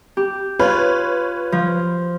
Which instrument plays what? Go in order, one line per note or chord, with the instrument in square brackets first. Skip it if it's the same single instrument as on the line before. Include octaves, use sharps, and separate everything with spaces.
[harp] G4
[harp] F4 [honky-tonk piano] B4 C#5
[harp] F3